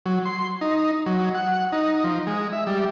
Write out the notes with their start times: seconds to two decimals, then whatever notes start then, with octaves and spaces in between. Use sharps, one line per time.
0.06 F#3
0.25 C6
0.61 D#4
1.06 F#3
1.35 F#5
1.72 D#4
2.04 F3
2.27 G#3
2.52 E5
2.67 G3